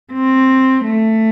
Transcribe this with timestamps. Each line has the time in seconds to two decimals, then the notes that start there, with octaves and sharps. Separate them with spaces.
0.12 C4
0.84 A3